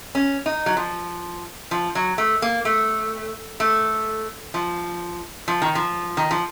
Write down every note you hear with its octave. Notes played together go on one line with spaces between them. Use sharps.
C#4
D#4
F#3
F3
F3
F#3
A3
A#3
A3
A3
F3
F3
D#3
F3
D#3
F3